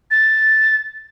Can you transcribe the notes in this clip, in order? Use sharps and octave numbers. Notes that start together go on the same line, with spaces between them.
A6